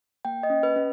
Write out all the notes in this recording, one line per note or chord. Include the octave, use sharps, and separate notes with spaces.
A#3 G5
D#5
C#4
B4
C#4